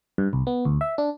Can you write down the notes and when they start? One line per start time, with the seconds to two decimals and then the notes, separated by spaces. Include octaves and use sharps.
0.18 G2
0.33 C2
0.47 B3
0.65 D2
0.81 E5
0.98 D4